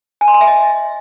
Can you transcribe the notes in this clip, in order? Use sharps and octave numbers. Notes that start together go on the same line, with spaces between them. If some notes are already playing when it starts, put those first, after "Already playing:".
G#5
C6
G#5
E5
D#5